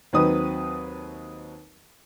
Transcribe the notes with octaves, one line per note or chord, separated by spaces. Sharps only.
D#2 F#3 C4 D#4 B4 D#6